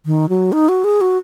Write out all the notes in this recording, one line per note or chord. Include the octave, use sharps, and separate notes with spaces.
D#3
F#3
D#4
F#4
G#4
F#4